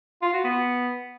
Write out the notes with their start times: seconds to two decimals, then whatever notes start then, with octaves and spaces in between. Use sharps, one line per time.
0.22 F4
0.33 F#4
0.44 B3